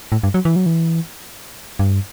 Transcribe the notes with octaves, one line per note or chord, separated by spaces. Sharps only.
A2
G2
F#3
E3
F#3
E3
G2